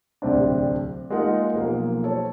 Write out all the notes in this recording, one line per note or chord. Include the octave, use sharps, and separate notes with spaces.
D1 C2 C4 D4
G#3 A#3 D#4 F4 A#4 F#5
B1 F3 A#3
A4 C5 C#5